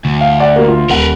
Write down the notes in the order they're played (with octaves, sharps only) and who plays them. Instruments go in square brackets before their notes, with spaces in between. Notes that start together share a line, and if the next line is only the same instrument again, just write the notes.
[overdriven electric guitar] D2
[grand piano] F5
D5 F#5
A#3 F#4
F4
[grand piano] D#1 F#5 [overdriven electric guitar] A#4 B4